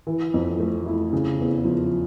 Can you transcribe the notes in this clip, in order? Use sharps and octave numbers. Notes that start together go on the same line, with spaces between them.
E3
F2
A3
E4
C#3
E2
F3